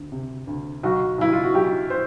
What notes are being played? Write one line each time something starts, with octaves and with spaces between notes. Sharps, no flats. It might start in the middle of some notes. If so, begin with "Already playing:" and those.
Already playing: D2
C3
D2
B1 F#4
B1 E4
F4
F#4
B1 G4
C5